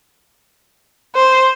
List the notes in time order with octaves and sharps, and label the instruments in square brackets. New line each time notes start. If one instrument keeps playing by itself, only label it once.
[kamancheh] C5